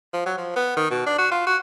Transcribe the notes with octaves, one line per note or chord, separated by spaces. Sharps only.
F3
F#3
F3
B3
D#3
B2
D4
F#4
F4
F#4